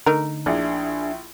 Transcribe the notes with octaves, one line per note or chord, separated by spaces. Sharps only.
D3 A3 D#4 A#4
A#1 D4 E4 G#4